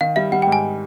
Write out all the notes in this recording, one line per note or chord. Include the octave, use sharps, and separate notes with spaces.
D#3 F5
G3 E5
G3 F#5
G#2 G5
G#5